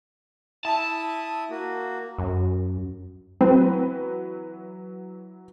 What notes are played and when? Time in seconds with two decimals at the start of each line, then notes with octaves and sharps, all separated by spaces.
0.65 E4 E5 A5 D#6
1.50 A#3 F#4
2.18 F#2
3.41 E3 F#3 C4 B4